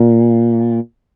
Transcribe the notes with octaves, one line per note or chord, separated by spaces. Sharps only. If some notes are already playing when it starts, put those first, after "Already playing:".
Already playing: A#2